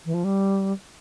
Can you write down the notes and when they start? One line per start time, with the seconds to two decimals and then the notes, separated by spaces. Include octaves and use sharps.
0.06 E3
0.14 F3
0.24 G3